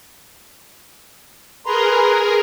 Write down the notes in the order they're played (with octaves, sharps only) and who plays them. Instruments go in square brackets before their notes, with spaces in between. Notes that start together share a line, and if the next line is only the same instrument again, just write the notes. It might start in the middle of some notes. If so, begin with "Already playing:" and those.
[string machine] G#4 A#4 [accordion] B4 A#5 C6